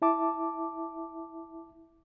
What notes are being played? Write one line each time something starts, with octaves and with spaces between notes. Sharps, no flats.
E4 E5 A5 D6